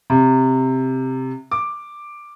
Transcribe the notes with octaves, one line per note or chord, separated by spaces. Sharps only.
C3
D6